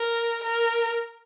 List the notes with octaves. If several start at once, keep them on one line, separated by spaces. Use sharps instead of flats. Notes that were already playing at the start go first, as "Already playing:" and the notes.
Already playing: A#4
A#4